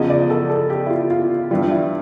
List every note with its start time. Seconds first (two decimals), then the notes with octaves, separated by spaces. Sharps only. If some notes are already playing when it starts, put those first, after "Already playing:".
Already playing: E2 C#3 F3 D#5
0.10 D5
0.30 A4
0.50 A4
0.70 G4
0.86 E4
0.90 F4
1.10 F4
1.51 G2 E3 G3 F4
1.71 E4